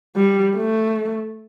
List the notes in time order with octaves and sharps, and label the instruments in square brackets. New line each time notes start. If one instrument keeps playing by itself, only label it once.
[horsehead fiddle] G3
A3